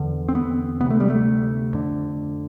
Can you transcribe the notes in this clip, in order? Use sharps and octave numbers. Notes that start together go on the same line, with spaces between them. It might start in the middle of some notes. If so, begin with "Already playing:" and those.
Already playing: E2 D3
C4
B3
D2 C3 A3 B3
G3
A3
F2 D3